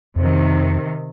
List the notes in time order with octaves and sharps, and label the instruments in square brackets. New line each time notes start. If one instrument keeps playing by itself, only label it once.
[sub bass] F2 [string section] C3 D#3